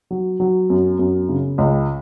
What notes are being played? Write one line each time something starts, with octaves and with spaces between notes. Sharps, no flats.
F#3
F#3
F#2
F#2
C#3
C#2